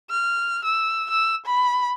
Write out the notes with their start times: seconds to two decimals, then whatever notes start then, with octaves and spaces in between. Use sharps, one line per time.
0.10 F6
0.65 E6
1.10 E6
1.45 B5